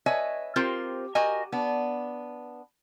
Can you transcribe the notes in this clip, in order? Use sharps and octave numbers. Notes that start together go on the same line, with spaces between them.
B4 C#5 D#5 E5 G#5
C4 F4 G4 A#4 C5
F#4 G4 A#4 D#5 G#5
B3 D4